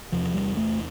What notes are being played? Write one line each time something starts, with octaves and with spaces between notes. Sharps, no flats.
E2 C3 F3
G3
A3